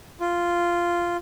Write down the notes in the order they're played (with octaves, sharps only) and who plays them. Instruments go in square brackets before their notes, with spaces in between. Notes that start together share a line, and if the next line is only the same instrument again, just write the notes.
[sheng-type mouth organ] F4